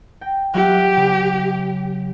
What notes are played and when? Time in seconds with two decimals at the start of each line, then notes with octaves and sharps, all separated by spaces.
0.21 G5 A#6
0.54 F#3 G4 E5 F#6
0.97 C#3